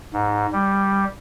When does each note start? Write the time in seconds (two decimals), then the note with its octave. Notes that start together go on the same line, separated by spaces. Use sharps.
0.13 G#2
0.52 G3